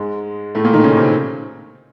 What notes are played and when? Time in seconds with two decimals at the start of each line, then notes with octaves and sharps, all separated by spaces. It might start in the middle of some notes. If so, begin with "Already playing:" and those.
Already playing: G#2 G#3
0.55 A2 A3
0.64 A#2 A#3
0.73 D#3 D#4
0.84 C#3 C#4
0.97 C3 C4